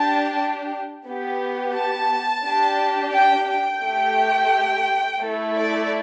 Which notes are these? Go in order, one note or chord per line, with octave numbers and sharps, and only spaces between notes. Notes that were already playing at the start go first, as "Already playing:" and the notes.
Already playing: D4 G4 A5
B3 G4
A5
D4 G4
G5
G5
A3 G4
A3 E4 A4
D5